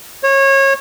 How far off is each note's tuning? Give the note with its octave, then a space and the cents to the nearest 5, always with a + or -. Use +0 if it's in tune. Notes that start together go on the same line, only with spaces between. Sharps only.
C#5 -25